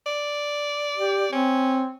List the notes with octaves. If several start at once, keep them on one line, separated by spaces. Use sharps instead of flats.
D5
G4
C4 C#4